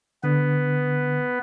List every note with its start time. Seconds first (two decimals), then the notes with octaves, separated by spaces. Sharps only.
0.24 D3 B3 B4